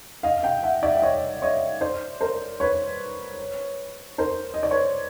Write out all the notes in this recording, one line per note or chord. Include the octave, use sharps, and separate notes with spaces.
D#5 F5
F5 G5
E5 F#5
D5 E5
E5
C#5 D#5
C#5 D#5
C5 D5
A#4 C5
B4 C#5
A#4 C5
D#5
D5
B4 C#5